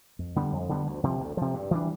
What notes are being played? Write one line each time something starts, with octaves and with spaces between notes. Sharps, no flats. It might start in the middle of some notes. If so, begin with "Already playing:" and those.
F2
D3 G3 B3
F2
D3 G3 B3
D2
C3 F3
D2
C3 F3
G2
E3 G3 D4